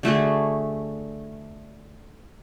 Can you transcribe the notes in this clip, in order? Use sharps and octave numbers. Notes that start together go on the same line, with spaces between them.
D3 A3 F#4 G#4